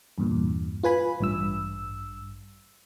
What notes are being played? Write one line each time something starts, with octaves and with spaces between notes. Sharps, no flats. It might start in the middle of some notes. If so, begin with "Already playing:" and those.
E2 G2 A#2
F4 B4 G#5 B5
A1 G2 E6